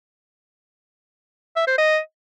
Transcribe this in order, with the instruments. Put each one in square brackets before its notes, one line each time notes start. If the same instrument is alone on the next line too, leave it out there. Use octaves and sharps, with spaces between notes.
[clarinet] E5
C5
D#5